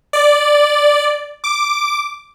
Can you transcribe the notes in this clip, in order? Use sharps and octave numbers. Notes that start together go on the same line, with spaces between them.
D5
D6